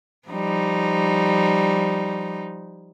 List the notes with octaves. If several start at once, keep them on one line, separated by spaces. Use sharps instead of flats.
F3 G3 D#4